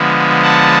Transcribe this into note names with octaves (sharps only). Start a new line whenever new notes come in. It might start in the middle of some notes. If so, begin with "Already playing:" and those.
Already playing: D3 F3 G#3 B3
F#5 A5